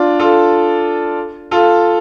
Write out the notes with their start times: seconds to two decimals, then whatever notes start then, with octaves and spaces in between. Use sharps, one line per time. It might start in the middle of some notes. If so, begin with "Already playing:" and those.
Already playing: D4 F4
0.20 F4 A4
1.51 F4 A4